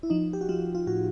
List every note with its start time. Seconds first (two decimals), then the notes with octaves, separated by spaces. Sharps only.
0.03 E4
0.10 F3 D#4
0.33 G4
0.41 F#4
0.49 F3 F4
0.75 F4
0.87 A2 F#4